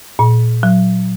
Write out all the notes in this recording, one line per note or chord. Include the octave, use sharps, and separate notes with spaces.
A#2
F#3